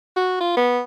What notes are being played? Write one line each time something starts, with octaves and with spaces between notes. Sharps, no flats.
F#4
F4
B3